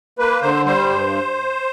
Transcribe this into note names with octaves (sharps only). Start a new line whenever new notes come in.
A#3 B4
D3 C5
G3 C5
G2